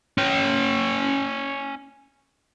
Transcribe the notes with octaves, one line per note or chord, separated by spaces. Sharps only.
C#4 G5